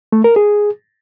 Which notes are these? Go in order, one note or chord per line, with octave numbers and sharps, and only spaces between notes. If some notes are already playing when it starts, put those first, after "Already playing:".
A3
A#4
G#4